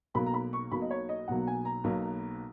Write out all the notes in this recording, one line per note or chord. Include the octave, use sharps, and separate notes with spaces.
B1 B2 F#3 A#3 B5
A#5
B5
C#6
B1 B2 F#3 A#3 B5
D#5
C#5
D#5
B1 B2 F#3 A#3 F#5
G#5
A#5
B1 B2 F#3 A#3